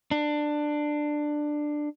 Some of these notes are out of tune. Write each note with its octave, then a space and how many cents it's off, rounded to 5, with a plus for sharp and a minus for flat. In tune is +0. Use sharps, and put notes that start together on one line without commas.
D4 +15